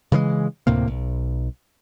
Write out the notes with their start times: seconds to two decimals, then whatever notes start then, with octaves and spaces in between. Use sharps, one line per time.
0.12 C#3 E3 G3 G#3
0.67 D2 A2 C3 A#3
0.88 B1